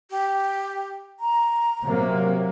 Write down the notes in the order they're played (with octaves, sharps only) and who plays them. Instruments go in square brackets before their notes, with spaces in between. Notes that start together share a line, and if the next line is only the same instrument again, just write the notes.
[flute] G4
A#5
[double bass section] C3 F#3 A#3